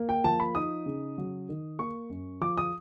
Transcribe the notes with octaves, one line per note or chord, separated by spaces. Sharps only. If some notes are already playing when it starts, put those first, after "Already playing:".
Already playing: A#3
G5
F3 A5
B5
D#4 D#6
C#3
F#3
D#3
A#3 C#6
F#2
F3 D6
D#6